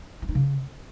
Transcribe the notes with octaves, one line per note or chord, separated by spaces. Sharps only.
E4
D#4
C#3